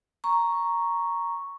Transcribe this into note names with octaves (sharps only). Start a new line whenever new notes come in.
A#5 C#6